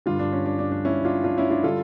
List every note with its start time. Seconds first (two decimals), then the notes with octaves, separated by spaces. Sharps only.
0.06 G2 D3 G3 D4 F4
0.19 D4
0.33 C#4
0.46 D4
0.59 D4
0.72 D4
0.85 C#4 E4
1.05 D4 F4
1.24 D4 F4
1.38 C#4 E4
1.51 D4 F4
1.63 D3 G3 F4 A4